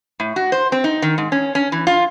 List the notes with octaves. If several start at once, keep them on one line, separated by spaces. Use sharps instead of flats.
A2
F#4
C5
C4
D#4
D#3
G#2
C#4
C#4
E3
F4